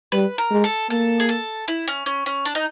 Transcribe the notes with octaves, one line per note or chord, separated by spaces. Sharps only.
G3 B4
A#4
G#3
A4
A#3 A4
G#4
A4
E4
C#4
C#4
C#4
D4
D#4